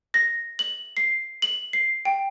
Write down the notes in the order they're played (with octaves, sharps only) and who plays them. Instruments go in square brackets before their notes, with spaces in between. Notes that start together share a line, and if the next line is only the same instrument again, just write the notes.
[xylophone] A#6
F#7
C7
F#7
C7
G5